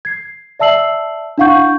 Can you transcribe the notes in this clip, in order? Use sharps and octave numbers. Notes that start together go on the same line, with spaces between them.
G#6 C7
D5 E5 A5 E6 C7 F#7
D4 E4 F5 F#5 C#6 G6